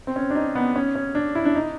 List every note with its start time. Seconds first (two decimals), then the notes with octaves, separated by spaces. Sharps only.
0.07 C4
0.16 C#4
0.30 D4
0.35 D#4
0.55 B3
0.76 C#4
0.95 C#4
1.15 D4
1.35 E4
1.45 D4
1.55 D#4